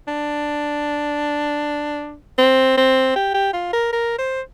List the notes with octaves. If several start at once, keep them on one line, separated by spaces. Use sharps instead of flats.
D4
C4
C4
G4
G4
F4
A#4
A#4
C5